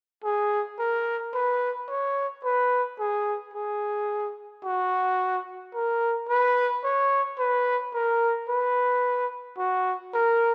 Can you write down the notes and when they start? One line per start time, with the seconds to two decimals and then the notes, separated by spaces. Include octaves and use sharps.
0.24 G#4
0.79 A#4
1.34 B4
1.88 C#5
2.44 B4
2.99 G#4
3.53 G#4
4.64 F#4
5.74 A#4
6.29 B4
6.84 C#5
7.38 B4
7.94 A#4
8.49 B4
9.58 F#4
10.14 A#4